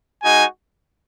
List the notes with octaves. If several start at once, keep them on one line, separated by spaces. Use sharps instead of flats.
G#3 D#4 F#4 G#5